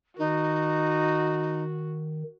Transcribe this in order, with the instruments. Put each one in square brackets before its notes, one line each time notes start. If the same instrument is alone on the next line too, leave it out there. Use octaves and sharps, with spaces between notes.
[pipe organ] D#3 [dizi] D#4 [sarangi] F#4